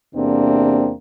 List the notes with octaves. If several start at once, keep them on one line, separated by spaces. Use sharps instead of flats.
E2 C3 A#3 C4 D4